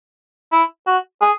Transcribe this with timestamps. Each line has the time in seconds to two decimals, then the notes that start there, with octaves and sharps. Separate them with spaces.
0.52 E4
0.87 F#4
1.21 G#4